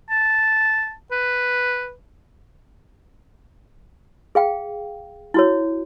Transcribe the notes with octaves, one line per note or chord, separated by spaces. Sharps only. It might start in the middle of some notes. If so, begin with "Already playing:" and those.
A5
B4
G#4 F5 G5
E4 F#4 C#5